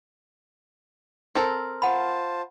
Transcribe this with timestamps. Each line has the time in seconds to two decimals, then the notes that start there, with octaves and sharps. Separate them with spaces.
1.35 C4 A4 A#4
1.82 F4 C5 F#5 A5 B5